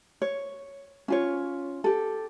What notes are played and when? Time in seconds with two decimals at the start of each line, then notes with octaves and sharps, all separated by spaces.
0.22 C#5
1.08 C#4 F4 C#5
1.84 G4 A4